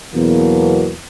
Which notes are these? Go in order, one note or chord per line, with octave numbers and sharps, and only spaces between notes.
E2 B2 F#3 A#3